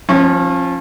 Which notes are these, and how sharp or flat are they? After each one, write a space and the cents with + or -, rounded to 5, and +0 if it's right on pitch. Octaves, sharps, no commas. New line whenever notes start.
F3 +0 C#4 -35